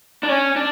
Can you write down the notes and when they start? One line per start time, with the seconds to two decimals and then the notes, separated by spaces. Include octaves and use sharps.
0.23 D4
0.29 C#4
0.56 D4